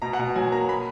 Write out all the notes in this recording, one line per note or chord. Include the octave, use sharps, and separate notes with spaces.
B2 A#5
F#5
B2
F#3 G#5
A#3 A#5
B5